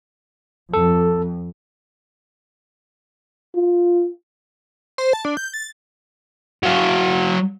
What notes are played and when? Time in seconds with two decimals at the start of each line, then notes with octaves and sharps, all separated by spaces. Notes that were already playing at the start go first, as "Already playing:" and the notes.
0.74 F2 A4
3.56 F4
4.98 C5
5.13 A5
5.25 D4
5.37 G6
5.54 A6
6.63 F#3 F5